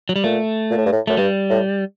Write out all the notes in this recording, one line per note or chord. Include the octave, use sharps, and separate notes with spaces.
F#3
G3
A#2 A3
A#2
A2
G2
A2
F#2 A3
G2 G3
A2